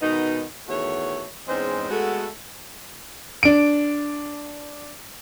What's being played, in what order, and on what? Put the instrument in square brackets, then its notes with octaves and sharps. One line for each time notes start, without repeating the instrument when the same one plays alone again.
[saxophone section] B2 D#3 G#3 B3 D#4
E2 D#3 A3 F#4 C#5
E2 G#2 G#3 C4 C#4 C5
G#3 A3 B3 F#4 A4
[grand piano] D4 D7